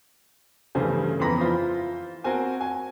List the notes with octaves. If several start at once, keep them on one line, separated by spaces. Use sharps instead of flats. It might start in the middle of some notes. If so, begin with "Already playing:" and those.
G2 C#3 E3 A3 C5 G#5
F2 E3 B3 A#5 B5 A#6
E4 F4 C5
C4 F#4 A#4 C5 G#5
G#5